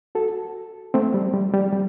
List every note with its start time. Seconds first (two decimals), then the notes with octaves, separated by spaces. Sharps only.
0.15 F#4 A4
0.94 A3 C4
1.14 G3
1.34 G3
1.53 G3
1.73 G3